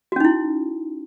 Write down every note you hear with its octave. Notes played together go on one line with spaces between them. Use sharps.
C#4 D#4 E4 F#4